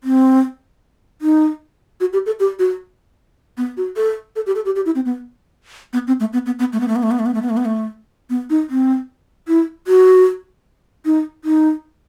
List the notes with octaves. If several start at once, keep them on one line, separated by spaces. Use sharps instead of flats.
C4
D#4
F#4
G4
A4
G4
F#4
B3
F#4
A4
A4
G4
A4
G4
G4
E4
C4
B3
B3
C4
A3
B3
B3
B3
A3
B3
A3
B3
A3
B3
A3
B3
A3
B3
A3
B3
A3
B3
D#4
C4
E4
F#4
D#4
D#4